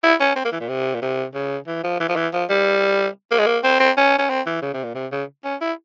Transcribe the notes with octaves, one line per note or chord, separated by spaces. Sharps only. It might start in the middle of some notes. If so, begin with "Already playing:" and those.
E4
C#4
C4
A#3
E3
A#2
C3
A#2
C3
C#3
E3
F3
E3
F3
E3
F3
G3
A#3
G#3
A#3
C4
C4
C#4
C#4
C4
E3
C#3
C3
A#2
C3
C#3
C#4
E4